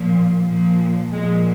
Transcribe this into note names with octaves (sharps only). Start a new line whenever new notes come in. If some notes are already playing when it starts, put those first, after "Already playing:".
Already playing: A#2 F3
A#2 F3
A#2 F3 G#3